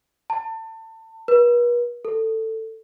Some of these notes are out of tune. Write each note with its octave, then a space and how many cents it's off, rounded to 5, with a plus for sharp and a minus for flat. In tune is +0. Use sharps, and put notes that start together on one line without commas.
A5 +30
B4 -45
A4 +15